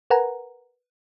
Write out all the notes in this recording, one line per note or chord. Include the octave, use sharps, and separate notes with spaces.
A#4 B4 F#5 G#5 A#5